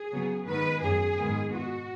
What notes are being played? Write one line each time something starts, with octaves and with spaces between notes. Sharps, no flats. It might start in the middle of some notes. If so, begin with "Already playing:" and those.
Already playing: G#4
C#3 F#3 B3
G#2 D#3 G#3 B3 B4
F#2 F#3 B3 G#4
G#2 D#3 G#3 B3
B2 B3 F#4